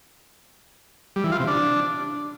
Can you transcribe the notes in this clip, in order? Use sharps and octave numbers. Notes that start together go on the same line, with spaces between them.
G3
E3
F4
C3
D4